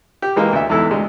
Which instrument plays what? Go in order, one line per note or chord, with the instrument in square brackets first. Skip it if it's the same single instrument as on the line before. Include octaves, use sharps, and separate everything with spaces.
[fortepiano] G4
E3 G#3 A#3
D2 E5
E2 G#2 E4 A4
D2 G#3